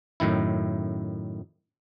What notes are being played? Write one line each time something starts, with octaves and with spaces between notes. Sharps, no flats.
F#2 A2 D#3 E4